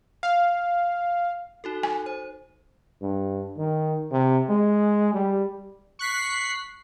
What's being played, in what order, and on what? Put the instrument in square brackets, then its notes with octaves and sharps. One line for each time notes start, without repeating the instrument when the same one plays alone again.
[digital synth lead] F5
[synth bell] D#4 F#4 A4
[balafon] G#5
[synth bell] C5
[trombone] G2
D#3
C3
G#3
G3
[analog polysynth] C#6 F#6 B6 C7